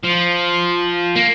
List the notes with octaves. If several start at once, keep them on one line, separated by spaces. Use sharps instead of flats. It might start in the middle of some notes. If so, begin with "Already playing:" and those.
F3
A#3